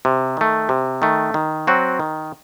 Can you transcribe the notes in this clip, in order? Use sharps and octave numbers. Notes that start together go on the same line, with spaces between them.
C3
D#3 A3
C3
D#3 A3
D#3
F#3 C4 F#4
D#3